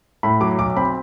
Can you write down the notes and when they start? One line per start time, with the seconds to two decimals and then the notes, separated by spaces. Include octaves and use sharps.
0.23 A2 B5
0.41 F#3 D6
0.59 B1 D6
0.76 C4 B5